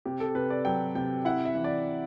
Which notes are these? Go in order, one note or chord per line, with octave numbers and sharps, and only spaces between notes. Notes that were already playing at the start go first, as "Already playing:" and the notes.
C3 G4
A4
C3 B4
D5
F#3 G5
C3 G5
E4 F#5
E5
E3
D5